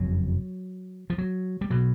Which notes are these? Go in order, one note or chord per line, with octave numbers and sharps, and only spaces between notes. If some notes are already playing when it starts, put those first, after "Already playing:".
Already playing: F#1 F2 C#3 F#3
F3
F#3
G3
B2 F#3